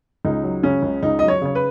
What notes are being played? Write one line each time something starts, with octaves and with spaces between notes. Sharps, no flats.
C#2 D#4
F#3
C#3 C#4
C#2
C#2 D#4
F#3 D#5
C#5
C#3 C#5
B4